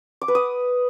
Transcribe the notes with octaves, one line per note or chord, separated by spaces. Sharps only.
D6
B4
D#6